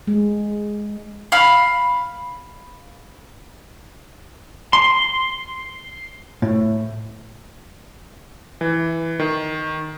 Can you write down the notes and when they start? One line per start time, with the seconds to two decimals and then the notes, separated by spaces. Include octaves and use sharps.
0.07 G#3
1.32 F5 B5 F6
4.73 C6
6.42 A2
8.61 E3
9.19 D#3